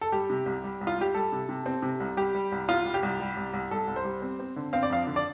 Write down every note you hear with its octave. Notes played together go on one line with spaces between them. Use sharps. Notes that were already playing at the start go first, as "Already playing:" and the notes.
A4
G3 G4
C3
C2
G3
C2
F4
G3 G4
G3 A4
C3
C3
C4
C3
C2
G3 G4
G3
C2
C2 F4
G3
G4
C2
G3
C2
C2
C2 A4
C2
C5
G3
C4
C4
D3
C4 F5
D5
F2 F5
D3
D5